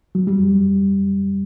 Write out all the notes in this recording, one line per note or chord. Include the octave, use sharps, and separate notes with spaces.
F#3
G3